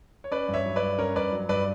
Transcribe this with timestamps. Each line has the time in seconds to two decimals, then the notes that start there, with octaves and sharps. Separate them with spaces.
0.24 C#5
0.31 C#4 B4 D5
0.48 G2
0.54 C#5 E5
0.65 F#3
0.76 B4 D5
0.82 G2
0.98 C#4 A#4 C#5
1.15 G2 B4 D5
1.32 F#3
1.49 G2 B4 D5